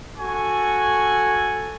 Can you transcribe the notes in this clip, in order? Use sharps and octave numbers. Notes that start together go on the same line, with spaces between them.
F#4 A4 G#5 C#6